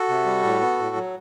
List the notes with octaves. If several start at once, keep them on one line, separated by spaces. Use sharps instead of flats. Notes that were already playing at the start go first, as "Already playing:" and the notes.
Already playing: F#4 A4
C3
G3
A2
B3
A2
F#3